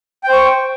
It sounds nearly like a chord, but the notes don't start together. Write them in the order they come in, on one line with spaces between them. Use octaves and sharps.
G5 C5 C#6